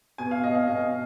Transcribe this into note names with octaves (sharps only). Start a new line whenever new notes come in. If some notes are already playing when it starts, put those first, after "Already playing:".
B2 G#5
F5
B2 D#5
F5
B2 D#5